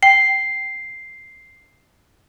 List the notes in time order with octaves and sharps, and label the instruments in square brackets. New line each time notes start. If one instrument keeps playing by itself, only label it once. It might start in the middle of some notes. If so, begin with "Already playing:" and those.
[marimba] G5 [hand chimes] C7